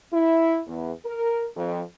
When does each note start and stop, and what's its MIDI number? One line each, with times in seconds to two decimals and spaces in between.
0.13 0.61 64
0.67 0.91 40
1.05 1.45 70
1.56 1.81 41